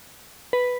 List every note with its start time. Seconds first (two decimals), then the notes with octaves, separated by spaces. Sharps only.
0.53 B4